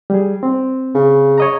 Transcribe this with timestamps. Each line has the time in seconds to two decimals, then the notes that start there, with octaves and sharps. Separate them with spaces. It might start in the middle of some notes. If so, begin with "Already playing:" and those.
0.10 G3 G#4
0.43 C4
0.95 C#3
1.38 C#5 D#5 A#5